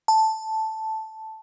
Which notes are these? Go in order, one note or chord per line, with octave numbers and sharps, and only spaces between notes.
A5